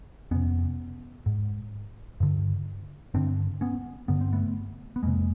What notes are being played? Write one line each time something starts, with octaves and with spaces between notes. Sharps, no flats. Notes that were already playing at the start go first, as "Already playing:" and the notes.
F2 C3 B3 C#4
G#2
G2 D3
G2 D3 C4 D4
B3 C#4
G2 D3 B3
C4
A3 B3
B3
F2 C3 G#3 A#3